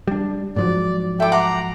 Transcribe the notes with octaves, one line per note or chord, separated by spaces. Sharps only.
G3 D4
G#2 F3 F#3 D5
E4 A4 G5 D6
F#5 A#5 C6 D6